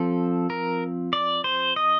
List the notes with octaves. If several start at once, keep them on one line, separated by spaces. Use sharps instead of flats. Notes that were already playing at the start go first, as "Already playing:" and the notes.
Already playing: F3 C4 A4
A#4
D5
C5
D#5